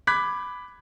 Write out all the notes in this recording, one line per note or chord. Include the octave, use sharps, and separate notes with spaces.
B5 D6 F#6 G#6 B6